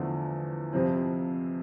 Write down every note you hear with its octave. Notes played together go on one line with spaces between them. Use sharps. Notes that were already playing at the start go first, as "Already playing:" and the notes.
Already playing: E2 D3 F3 A3
F2 C3 F3 C4